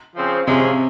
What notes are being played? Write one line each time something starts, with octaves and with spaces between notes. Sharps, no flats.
C#3 F3 C4
C3 F3 G#3 C#4 F4